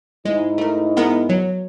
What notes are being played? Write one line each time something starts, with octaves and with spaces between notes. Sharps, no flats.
G#2 G#3 E4
A3 A#4
G#3 B3 A#4
F#3